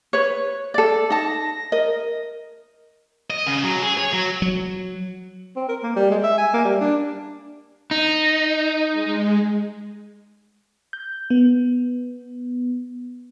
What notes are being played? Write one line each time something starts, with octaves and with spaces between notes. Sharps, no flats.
B4 C#5
A4 D5
D#4 A5 A#6
A#4 D#5
D#5
C#3
F#3
G#4
C#5
F#3
F#3
C4
A#4
A#3
G3
G#3
E5
G#5
A#3
G3
D4
D#4
G#3
G6
B3